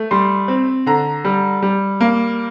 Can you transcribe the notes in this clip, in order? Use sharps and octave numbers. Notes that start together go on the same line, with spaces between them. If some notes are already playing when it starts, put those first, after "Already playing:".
Already playing: A3
G3 C6
C4
D3 A#5
G3
G3
A#3